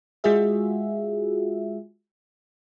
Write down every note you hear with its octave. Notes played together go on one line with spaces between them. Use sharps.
G#3 F4 F#4 G#4 E5